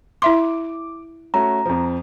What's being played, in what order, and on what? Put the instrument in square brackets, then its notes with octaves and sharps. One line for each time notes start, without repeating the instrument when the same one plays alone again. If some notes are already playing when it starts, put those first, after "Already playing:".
[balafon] E4 E5 C6 [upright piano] D6
[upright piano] A3 C#4 F#4 [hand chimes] A#5
[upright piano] F2 F3